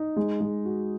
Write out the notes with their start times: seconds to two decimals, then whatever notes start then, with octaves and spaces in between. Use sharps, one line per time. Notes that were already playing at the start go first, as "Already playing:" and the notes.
Already playing: D#4
0.16 G#3
0.40 G#3
0.65 F#4